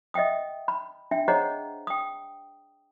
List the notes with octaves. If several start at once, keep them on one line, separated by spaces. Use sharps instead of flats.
D#5 E5 F#5 G5 D#6
B5
D4 E5 G5
G#4 C5 C#5 D#5 F#5 A#5
G5 D#6